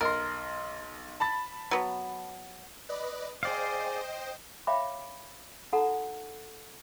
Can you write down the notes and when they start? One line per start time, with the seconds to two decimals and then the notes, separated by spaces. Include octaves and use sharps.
0.01 B1 A#4 C6
1.20 A5 B5 A6
1.71 F#3 B3
2.89 B4 D5 D#5
3.43 G#4 C5 D5 D#5 F5 G5
4.67 C#5 E5 F5 G5 B5 D6
5.72 D#4 F#4 A4 F#5 A#5